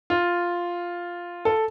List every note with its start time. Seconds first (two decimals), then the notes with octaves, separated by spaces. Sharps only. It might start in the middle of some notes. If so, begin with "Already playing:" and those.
0.10 F4
1.45 A4